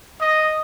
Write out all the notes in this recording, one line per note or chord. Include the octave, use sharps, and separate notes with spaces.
D#5